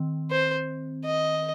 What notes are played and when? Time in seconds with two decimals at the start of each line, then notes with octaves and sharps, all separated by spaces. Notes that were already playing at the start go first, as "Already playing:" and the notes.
Already playing: D#3 C4
0.31 C5
1.06 D#5